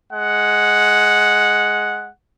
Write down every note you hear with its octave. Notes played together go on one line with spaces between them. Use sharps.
G#3 F#5